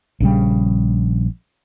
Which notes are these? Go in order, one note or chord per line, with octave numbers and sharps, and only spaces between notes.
A#1 C#3 G3